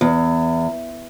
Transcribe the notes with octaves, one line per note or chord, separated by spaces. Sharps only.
E2